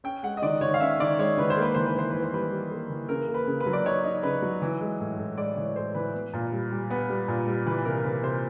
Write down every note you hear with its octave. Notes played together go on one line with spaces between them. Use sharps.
C#4 G5
G#3 F#5
D#5
D#3 D5
D#3 C#5
F5
C#4 E5
D#3 D5
G#3 C#5
D#3 B4
C5
A#3 B4
E3 C5
B4
E3 C5
E3 B4
C5
G3 B4
G3
A#3
E3
C#3 A#4
A#3
B4
C#3
B4
F#3
D5
D#4 C#5
D#4
C#3 B4
F#3
E3
G#3
A2
A2
G#3 D5
E3 C#5
A2 C5
E3 B4
B3
A#2
G3
G3
B3
G3
A#2
G3
E3 B4
C3 A#4
C3 B4
C3 C5